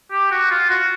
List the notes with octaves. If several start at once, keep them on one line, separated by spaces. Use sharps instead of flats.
G4
F#4
F4
F#4